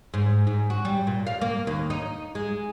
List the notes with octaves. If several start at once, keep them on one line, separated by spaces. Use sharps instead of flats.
G#2
G#2
F#4
G3
A#2
F5
A#3
D#2
D#4
G#3